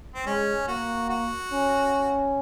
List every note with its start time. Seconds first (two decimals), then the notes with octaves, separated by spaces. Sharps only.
0.15 C4
0.26 G#3 C#4
0.68 A#3 F#4
1.10 F#4
1.52 C#4